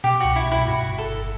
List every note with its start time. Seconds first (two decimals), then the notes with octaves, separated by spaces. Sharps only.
0.04 B2 G4
0.20 C2 F#4
0.36 E4
0.45 C2
0.52 E4
0.67 G2 F#4
0.87 G1
0.98 A4
1.08 G1